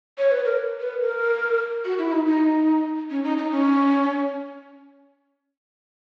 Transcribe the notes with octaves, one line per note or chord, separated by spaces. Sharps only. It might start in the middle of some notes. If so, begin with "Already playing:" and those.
C#5
B4
A#4
B4
A#4
F#4
E4
D#4
D#4
C#4
D#4
D#4
C#4